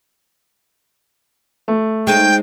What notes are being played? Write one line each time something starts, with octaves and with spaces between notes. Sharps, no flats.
A3
G#3 C4 D#4 G5